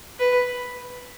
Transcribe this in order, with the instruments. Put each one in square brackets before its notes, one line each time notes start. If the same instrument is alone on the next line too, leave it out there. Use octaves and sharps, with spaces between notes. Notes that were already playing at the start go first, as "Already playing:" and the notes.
[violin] B4